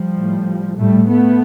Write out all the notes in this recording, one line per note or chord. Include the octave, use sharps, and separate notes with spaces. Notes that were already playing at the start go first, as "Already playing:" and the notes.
Already playing: F3 G3
A2
A2 G3 A3
A3 B3